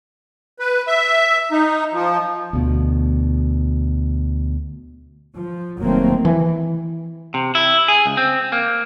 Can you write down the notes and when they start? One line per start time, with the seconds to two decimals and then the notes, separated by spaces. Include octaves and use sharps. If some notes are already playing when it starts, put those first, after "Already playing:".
0.59 B4
0.87 E5
1.52 D#4
1.93 F3
2.53 D2 B2
5.36 F3
5.79 F1 D#3 F#3 A3 A#3 C4
6.25 E3
7.34 C3
7.55 E4
7.88 G#4
8.06 C#2
8.17 C4
8.52 A#3